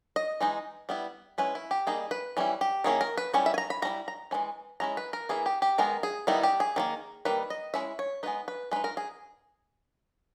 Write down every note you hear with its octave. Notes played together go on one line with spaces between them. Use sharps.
D#5
E3 G#3 D#4
G3 B3 E4
G#3 C#4 E4 B4
E4
G4
G3 A#3 D#4 G#4
B4
E3 G3 C#4 E4
G4
D#3 A#3 C#4 E4 G#4
A#4
B4
G3 C#4 E4 C#5
E5
G#5
A#5
B5
G3 C#4 E4 A#5
A#5
E3 G#3 C#4 E4
G#3 C#4 E4 A#5
B4
A#4
E3 A#3 E4 G#4
G4
G4
D#3 G#3 B3 A#4
G#4
D#3 G3 B3 D#4 E4
G4
G#4
D#3 G3 A#3
D#3 G3 A#3 B4
D#5
G#3 C#4 E4 E5
C#5
G#3 B3 D#4 B4
B4
G#3 D#4 B4
A#4
G#4